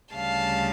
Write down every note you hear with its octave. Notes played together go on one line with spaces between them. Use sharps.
D2 C#3 G3 F5 A5